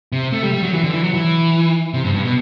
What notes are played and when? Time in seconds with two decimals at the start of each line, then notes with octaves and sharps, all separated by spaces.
0.12 C3
0.33 A3
0.43 G3
0.53 G3
0.63 F#3
0.73 E3
0.84 D3
0.93 E3
1.04 F#3
1.14 E3
1.94 C3
2.04 G2
2.14 G2
2.25 B2